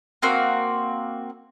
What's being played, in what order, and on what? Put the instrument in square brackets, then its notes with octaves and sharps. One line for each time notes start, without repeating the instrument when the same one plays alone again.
[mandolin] A#3 C4 F#4